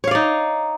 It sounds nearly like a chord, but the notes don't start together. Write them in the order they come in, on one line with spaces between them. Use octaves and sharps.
C#5 F5 D5 D#4